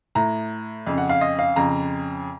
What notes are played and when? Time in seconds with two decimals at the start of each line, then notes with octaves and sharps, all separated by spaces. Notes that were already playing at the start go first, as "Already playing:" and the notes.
0.15 A2 A#5
0.86 F2 C#3
0.98 F#5
1.09 F5
1.21 D#5
1.39 F5
1.56 F2 C#3 A#5